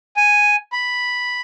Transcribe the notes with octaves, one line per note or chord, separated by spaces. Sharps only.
G#5
B5